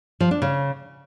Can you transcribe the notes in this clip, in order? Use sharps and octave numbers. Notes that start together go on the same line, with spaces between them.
F3
D4
C#3